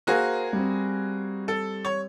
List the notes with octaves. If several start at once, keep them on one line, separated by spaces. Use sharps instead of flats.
A#3 F#4 G#4 A#4 C5
G3 C4
A4
C#5